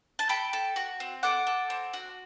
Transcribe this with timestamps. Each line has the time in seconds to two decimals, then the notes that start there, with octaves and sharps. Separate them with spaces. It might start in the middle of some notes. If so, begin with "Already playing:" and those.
0.19 A5
0.29 A4 G5 B5
0.53 A4
0.76 F#4
1.00 C4
1.23 A4 D5 F#5
1.47 A4
1.70 C4
1.93 F#4